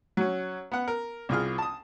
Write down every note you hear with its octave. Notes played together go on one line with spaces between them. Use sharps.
F#3 C#4
B3 F#5
A#4
C2 F4 G#4 F6
A5 D#6